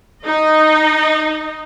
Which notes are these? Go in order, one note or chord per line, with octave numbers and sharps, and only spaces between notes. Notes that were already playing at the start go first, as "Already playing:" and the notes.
D#4 D#5